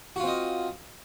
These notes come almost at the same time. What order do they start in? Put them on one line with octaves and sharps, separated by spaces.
F#4 F4 C4 D#5